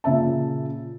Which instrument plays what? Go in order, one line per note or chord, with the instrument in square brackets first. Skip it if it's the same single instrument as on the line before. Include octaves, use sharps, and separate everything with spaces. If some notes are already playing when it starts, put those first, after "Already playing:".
[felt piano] A#2 C#3 E5 A5